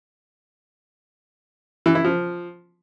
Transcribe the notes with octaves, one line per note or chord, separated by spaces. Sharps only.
E3
E4
F3